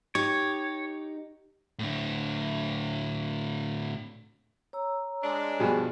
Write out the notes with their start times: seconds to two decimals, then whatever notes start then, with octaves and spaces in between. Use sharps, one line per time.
0.15 D#4 G4 C#5
1.79 A2 D3
4.73 C#5 A#5 E6
5.23 G#3 D4
5.59 G2 B2 F3 G#4